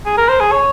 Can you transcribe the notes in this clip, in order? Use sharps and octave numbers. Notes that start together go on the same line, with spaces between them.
G#4
A#4
C5
G#4
C#5